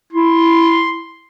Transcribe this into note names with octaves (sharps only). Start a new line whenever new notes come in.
E4 C6